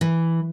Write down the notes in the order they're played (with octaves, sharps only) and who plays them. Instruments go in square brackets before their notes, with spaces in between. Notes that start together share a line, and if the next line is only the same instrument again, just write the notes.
[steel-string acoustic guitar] E3